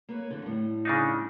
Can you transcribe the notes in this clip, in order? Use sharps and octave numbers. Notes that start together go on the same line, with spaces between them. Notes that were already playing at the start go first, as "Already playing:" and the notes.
A#3 B4 C#5
F2 D3
A2 G3
C#3 D4 D#4